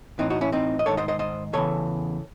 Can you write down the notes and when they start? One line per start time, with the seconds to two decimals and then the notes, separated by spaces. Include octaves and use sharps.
0.19 A2 E3 C4 D#4
0.30 D#4 F#4
0.41 C#4 E4
0.52 C4 D#4
0.79 D#5
0.86 G#2 D#3 A4 C#5
0.97 C5 D#5
1.08 C5 D#5
1.19 C5 D#5
1.53 E2 C#3 E3 A4 C#5